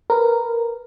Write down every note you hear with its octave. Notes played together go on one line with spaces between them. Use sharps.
A#4 B4